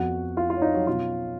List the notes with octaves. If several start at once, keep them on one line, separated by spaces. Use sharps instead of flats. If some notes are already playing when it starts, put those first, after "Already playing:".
Already playing: F2 F3 B3 F#4 F#5
F4 F5
F4 F5
C#5
D#4 D#5
F#3 F#4
B2 F#3 C#4 F4